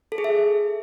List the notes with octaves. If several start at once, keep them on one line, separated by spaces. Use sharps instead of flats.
A4
G#4
E5